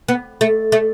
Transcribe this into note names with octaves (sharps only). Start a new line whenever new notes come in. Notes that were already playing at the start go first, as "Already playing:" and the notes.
B3
A3
A3